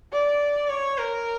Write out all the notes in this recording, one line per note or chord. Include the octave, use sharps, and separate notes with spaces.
D5
C#5
A#4